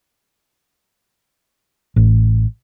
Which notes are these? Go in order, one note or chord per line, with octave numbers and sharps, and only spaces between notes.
A1